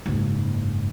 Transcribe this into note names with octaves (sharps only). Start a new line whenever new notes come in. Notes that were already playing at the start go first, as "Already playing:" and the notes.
F#1 G#2